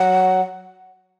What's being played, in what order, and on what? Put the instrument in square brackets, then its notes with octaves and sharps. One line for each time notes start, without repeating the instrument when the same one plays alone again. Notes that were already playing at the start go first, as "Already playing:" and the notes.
Already playing: [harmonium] F#3 [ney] F#5